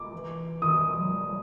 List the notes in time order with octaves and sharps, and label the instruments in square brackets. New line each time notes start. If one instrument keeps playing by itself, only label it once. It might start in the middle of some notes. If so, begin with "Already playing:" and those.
Already playing: [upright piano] D6
[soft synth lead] E3
[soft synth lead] D#3 [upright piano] D#6
[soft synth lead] E3
E3
F#3
G3